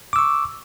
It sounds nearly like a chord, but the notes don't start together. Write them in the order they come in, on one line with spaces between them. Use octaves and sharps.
D6 E6 C#6